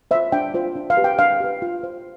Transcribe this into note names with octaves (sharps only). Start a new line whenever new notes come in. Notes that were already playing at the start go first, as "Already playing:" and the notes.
F4 C5 E5
D4 G5
F4 C5
D4
F5
G4 B4
G5
D4 F5
G4 B4
F4
C5